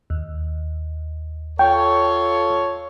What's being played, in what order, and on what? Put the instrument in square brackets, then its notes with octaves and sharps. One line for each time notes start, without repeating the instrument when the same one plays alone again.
[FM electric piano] D#2
[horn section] F4 A4 C#5 [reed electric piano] G5